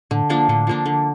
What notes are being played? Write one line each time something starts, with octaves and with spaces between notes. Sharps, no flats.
A2 D3
F3 A#3 D4
A2 D3
F3 A#3 D4
D3